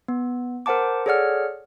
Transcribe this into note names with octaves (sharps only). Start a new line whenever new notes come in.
B3
A#4 C5 F#5 A5 D6
G#4 A4 C#5 D5 F#5 F6